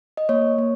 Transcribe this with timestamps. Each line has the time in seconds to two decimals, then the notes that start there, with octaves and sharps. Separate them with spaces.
0.17 D#5
0.29 A#3 C#5
0.58 A#3